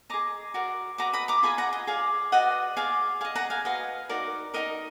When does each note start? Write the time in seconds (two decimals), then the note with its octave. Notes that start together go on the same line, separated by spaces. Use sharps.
0.10 G#4 D#5 A#5 D6
0.54 F#4 A#4 D5
0.98 F#4 B4 D#5 A#5 D6
1.13 B5 D#6
1.28 A#5 D6
1.43 F4 G#4 D#5 G#5 B5
1.58 F#5 A#5
1.73 D#5
1.87 G#4 D5 F5
2.32 F#4 B4 D5 D#5 F#5
2.77 G#4 D5 F5
3.21 G#4 D#5 F5
3.36 F#5 A#5
3.50 F5 G#5
3.65 F#4 B4 D#5 F5
4.09 D#4 F#4 A#4 D5
4.54 D#4 F#4 A#4 D#5